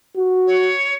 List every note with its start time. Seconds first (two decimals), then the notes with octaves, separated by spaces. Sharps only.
0.16 F#4
0.47 C#5